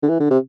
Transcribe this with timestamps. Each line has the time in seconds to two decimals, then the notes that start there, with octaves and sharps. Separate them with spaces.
0.03 D3
0.09 E3
0.20 D3
0.31 C3